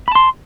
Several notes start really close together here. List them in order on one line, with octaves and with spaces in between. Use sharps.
B5 A5 C6